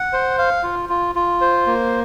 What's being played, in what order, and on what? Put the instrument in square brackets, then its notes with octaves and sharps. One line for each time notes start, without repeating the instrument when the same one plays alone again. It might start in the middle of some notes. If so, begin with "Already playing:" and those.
Already playing: [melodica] F#5
C5
F5
F4
F4
F4
C5
A#3